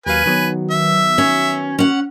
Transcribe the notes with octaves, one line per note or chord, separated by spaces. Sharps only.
D#2 F#3 B4 F5 G#5
D#3 F#3 B3
E5
C#4
C#4 F#5